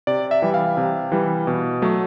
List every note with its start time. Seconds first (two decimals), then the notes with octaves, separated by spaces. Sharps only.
0.07 C3 D5
0.31 E5
0.42 E3 G3
0.54 F5
0.77 C3
1.12 E3 G3
1.47 B2
1.82 F#3 A3